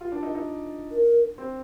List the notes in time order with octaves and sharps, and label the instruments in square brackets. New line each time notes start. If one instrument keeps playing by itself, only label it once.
[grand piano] F4
D4
D#4
D#4
[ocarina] A#4
[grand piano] C4